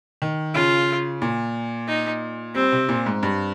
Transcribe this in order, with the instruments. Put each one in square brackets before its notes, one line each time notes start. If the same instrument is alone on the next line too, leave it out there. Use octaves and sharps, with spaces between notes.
[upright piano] D#3
[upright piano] C#3 [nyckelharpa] F4
[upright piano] A#2
[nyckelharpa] D#4
[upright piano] G3 [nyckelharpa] C4
[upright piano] C3
A#2
G#2
G2